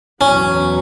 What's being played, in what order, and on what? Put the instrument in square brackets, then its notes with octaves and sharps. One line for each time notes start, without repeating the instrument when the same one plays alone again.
[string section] E2 B2 F#3 [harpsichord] C#4